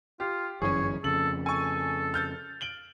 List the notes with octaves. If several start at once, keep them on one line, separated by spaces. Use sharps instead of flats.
F4 G4
G1 F#2 E3 C#4 G#4 C#5
F2 C#3 A4 F#7
A4 G#5 C#6
F6 G6 A6
D7 F#7 G7